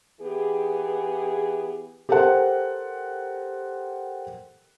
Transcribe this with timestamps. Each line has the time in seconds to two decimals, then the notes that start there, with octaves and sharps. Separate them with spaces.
0.21 E3 B3 G4 G#4
2.09 G4 A4 A#4 C5 F#5